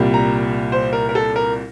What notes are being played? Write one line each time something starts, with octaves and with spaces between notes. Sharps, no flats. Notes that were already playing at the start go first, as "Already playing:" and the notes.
Already playing: C2 A#2 G3
A#5
C5
A#4
A#4
A4
A#4